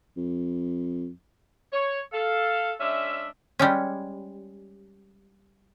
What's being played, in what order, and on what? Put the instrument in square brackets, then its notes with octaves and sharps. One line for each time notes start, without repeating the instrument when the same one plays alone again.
[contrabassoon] F2
[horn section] C#5
A4 F5
G#3 C#4 D4 E5
[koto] G3 G#3 C#4